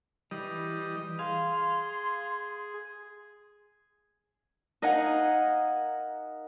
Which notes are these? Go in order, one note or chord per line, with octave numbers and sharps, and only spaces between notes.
E3 G3 D#5
G#4 F5 C6
D#4 A#4 D#5 F5 F#5 G#5